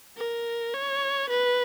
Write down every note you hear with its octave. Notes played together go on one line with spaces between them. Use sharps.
A#4
C#5
B4